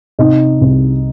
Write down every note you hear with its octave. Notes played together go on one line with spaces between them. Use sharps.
C3 D#4
C2